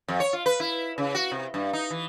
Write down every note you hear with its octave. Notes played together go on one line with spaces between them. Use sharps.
F2
C#5
F4
B4
E4
C#3
F#4
C3
G2
D#4
E3